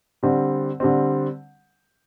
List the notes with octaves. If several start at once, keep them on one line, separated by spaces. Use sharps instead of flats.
D3 G3 C4
D3 G3 C4